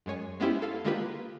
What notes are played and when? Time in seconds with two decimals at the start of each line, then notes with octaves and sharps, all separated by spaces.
0.06 F#2 G#3 C#5 G#5
0.40 G#3 B3 C#4 E4 G4 C5
0.62 A4 F5
0.84 D3 G#3 A#3 F4 G4 B4